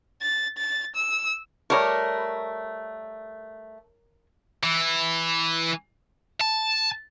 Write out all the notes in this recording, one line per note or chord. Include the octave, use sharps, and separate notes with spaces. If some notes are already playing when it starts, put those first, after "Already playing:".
A6
A6
E6
G3 A3 A#4 C#5
E3
A5